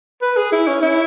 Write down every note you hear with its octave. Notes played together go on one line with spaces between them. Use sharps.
B4
G#4
E4
C#4
E4